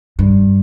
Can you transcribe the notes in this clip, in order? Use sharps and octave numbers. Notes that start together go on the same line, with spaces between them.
G2